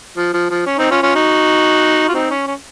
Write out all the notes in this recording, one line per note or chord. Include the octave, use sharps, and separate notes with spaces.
F3
F3
F3
C#4
C4 D#4
C#4 F4
C#4 F4
D#4 F#4
F4
C4 D#4
C#4
C#4